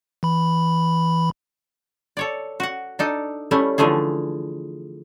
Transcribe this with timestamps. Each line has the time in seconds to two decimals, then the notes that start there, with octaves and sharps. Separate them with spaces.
0.23 E3 B5
2.17 A4 C#5 D5
2.60 F#4 F#5
2.99 D4 D#4 A4
3.51 G3 A3 C#4 E4
3.78 D3 E3 F3 A3 G#4